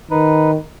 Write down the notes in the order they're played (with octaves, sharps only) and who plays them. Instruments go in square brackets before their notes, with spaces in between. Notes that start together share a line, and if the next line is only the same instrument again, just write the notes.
[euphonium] D#3 [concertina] D#4 B4